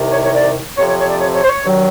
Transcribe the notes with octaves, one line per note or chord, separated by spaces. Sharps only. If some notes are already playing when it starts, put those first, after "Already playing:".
Already playing: C2 C3 D#3
C#5
C#5
D5
F2 C3 F3 C#5
C#5
C#5
D5
C#5
C#5
C5
C#5
G2 D#3 F#3